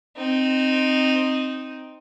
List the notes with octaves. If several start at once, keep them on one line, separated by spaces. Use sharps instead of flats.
C4 D#4